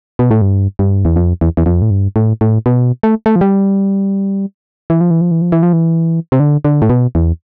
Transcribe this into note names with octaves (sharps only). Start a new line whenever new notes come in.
B2
A2
G2
G2
E2
F2
E2
E2
F2
A2
G2
A2
A2
B2
A3
A3
F3
G3
E3
F3
E3
F3
E3
F3
E3
F3
E3
C3
D3
D3
A2
B2
E2